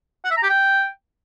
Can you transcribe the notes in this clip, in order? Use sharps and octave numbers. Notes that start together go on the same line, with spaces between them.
F#5
E5
A#5
G4
G5